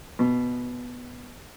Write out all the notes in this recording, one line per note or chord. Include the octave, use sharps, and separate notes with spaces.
B2